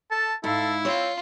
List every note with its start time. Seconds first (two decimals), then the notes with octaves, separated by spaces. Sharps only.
0.11 A4 A5
0.44 G#2 E4 A4 F5
0.85 C4 F4 C#5